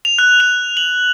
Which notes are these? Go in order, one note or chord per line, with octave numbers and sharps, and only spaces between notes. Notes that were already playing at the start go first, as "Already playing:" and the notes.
F7
F#6
F7
F#7